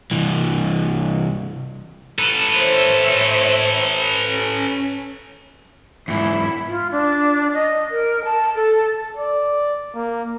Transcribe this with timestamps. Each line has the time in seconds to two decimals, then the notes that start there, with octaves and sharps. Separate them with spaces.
0.11 C2 E3
2.19 A4 B4
2.57 C5 C#5 E5
4.30 C#4
6.08 E2 G#2 E4
6.68 F4
6.92 D4
7.54 D#5
7.91 A#4
8.25 A5
8.56 A4
9.17 D5
9.95 A#3